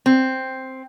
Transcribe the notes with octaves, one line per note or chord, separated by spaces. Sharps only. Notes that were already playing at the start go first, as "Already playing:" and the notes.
C4